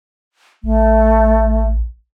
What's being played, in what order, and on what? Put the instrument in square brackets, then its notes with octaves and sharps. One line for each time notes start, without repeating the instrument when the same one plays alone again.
[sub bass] A1 [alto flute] A3